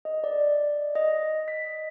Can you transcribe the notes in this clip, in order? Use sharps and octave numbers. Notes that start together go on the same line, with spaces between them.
D#5
D5
D#5
B6